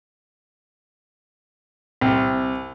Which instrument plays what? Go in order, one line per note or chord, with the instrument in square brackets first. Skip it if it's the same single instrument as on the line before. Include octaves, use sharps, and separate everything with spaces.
[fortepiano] C2